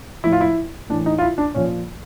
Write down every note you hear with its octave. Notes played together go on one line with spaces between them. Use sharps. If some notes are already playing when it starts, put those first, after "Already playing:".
A2 F3 E4
F4
E4
A2 E3 D4
D#4
F4
E4
D4
A#2 F3 C#4